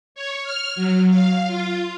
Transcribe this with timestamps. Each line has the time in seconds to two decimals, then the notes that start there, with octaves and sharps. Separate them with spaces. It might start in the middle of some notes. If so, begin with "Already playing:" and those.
0.15 C#5
0.44 F6
0.75 F#3
1.09 F5
1.47 F4